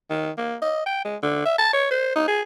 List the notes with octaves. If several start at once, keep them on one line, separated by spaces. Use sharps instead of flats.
D#3
A#3
D#5
G5
G#3
D3
E5
A5
C#5
C5
D#4
G#4